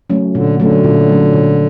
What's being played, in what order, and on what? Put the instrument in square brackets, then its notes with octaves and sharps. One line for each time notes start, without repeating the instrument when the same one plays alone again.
[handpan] F#3 A3 C#4
[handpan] A#2 [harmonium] D3
[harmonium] D3 [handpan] F#3 A3 C#4
[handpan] A#2
F#3 A3 C#4
A#2